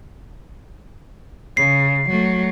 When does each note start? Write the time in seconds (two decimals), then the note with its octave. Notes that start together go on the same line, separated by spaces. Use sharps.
1.57 C#3 C7
2.10 F#3 A3